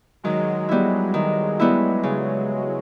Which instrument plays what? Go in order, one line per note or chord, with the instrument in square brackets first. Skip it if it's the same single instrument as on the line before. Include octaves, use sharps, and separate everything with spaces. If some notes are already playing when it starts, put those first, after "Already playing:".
[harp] D#3 [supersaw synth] F#3 G#3
[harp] G3 B3 E4
D#3
G3 B3 E4
C#3